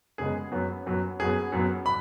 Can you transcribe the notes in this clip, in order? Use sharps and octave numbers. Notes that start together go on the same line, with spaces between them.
F#2 C#3 G#3 B3 G#4
F#2 F#3 B3
F#2 F#3 B3
F#2 F#3 B3 G#4
F#2 F#3 B3
B5